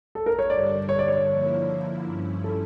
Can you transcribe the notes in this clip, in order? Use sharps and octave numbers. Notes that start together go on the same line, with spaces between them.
A4
A#4
C#5
G2 D3 G3 D4 D5
C#5
D5
C#5
D3 F3 A#3 E4
G2 F3 C#4 E4
A4